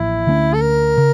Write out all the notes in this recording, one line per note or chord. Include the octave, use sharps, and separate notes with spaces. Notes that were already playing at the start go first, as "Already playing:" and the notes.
Already playing: A1 A2 F3 A#3 E4
D2 D3 A3 C#4
A4
A#4
C#3